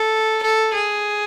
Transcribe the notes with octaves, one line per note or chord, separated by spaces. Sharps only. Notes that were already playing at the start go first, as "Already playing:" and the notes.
Already playing: A4
A4
G#4